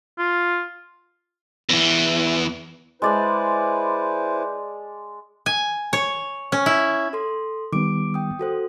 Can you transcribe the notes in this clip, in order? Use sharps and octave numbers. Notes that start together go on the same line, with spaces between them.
F4
E2 E3
G#3 E4 B4 C5 D5 A5
G#5
C#5
C#4
E4
A4 C6
D#3 G3 B3 D6 D7
G5 D#6
F#4 A4 C5